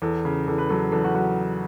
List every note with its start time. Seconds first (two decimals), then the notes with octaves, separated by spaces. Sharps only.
0.02 E2 A4
0.25 C#3
0.47 E2 A4
0.58 B4
0.69 F#3 A4
0.92 E2 A4
1.04 F#4
1.15 F#3 F#4